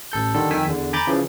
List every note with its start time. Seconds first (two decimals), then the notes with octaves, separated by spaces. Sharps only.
0.12 A1 A4 G6
0.34 D3 D#3 G3 A4
0.51 F2 D#3 G5 G#5 E6 B6
0.66 E2 D3
0.93 G#5 A#5 B5 D6 G6 A6
1.07 C#3 E3 F3